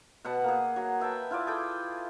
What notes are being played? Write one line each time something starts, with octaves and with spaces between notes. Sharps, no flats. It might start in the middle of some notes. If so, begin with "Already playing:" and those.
B2 B4 F#5 A5
A#3 G#4
F#3
B4 E5 G5 A5
E4 F4 B4 D5
G#4 A4 G5